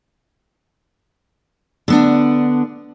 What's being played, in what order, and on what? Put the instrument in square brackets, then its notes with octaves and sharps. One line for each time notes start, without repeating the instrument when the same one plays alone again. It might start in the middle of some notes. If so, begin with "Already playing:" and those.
[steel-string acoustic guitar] D3 B3 D4